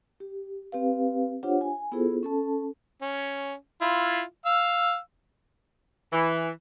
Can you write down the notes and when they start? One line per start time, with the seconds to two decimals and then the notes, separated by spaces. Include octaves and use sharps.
0.20 G4
0.72 C4 G4 B4 F5
1.43 D4 F4 G4 C5 C#5 F#5
1.61 G#5
1.92 B3 E4 F4 G#4 A4 C5
2.23 C#4 A4 A5
3.02 C#4
3.81 E4 F4
4.46 F5 E6
6.13 E3